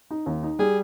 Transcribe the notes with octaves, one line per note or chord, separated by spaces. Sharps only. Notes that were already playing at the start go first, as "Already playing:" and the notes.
D#4
D#2
D#4
G3 G#4